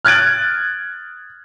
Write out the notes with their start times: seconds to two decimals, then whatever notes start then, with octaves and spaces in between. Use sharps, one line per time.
0.05 F6 F#6 G#6 A6 D7 F#7